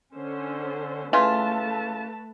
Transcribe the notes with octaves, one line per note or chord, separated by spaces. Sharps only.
D3 C#4 C5
C#3 E3 A3 F4 B4 A5